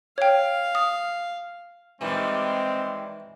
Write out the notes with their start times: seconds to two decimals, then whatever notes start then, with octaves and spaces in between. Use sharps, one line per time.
0.18 C#5 F5 G5
0.75 D#6
2.01 D#3 E3 G3 G#3 C4